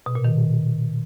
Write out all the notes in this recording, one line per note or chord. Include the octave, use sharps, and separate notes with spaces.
B2
A#2
D#3